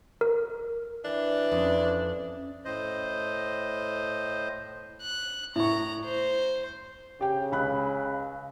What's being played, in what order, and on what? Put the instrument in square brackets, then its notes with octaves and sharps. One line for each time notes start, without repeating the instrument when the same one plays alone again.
[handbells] A#4
[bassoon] E3 [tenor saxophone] D4
[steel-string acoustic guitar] F2 [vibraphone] C#4 D#6
[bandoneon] A2 C5 D#5
[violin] F#6
[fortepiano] A2 C#6 [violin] A#5
[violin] C5
[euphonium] C#3 [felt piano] G4 G5
[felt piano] C#2 B5 F#6